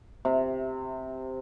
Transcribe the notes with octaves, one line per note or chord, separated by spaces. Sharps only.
C3